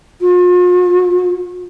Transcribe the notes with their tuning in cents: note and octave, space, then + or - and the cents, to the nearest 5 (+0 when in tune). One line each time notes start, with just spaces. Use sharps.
F4 +45